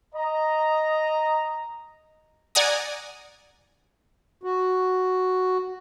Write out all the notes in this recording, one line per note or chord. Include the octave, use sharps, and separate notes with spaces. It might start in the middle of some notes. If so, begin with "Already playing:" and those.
D#5 A#5
D5 F#5 G#5 A#5 D#6
F#4